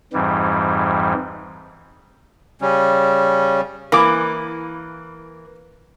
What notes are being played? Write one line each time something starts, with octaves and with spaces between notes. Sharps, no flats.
F2 G#2 E3 G3
C#3 G3 C#4
E3 A#3 D6